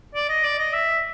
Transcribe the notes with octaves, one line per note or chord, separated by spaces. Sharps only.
D5
D#5
D5
D#5
E5